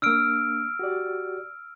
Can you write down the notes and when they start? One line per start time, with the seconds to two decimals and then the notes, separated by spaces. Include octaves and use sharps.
0.02 A#3 D4 E6 F6 D7
0.79 F#4 G4 D5